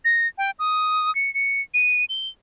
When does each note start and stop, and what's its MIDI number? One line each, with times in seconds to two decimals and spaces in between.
0.05 0.28 94
0.38 0.51 79
0.59 1.13 87
1.15 1.33 97
1.34 1.61 97
1.74 2.05 99
2.09 2.28 103